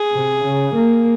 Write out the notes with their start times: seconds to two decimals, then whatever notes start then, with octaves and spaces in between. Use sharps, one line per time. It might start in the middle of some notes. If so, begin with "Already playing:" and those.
Already playing: G#4
0.14 C3
0.45 C#3
0.77 A#3